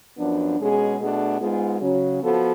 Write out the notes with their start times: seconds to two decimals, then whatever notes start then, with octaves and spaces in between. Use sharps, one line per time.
0.17 F#2 F3 B3 D4
0.58 B2 G#3 C#4 G#4
1.00 B2 A3 D4 G#4
1.40 G#2 G#3 B3 F4 G#4
1.81 C#3 F#3 C#4
2.22 F3 B3 F#4 A4